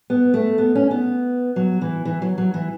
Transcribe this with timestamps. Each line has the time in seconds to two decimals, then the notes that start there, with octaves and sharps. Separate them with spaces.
0.10 B3
0.34 A3
0.58 B3
0.75 C#4
0.91 B3
1.56 F#3
1.81 E3
2.05 E3
2.22 F#3
2.38 F#3
2.54 E3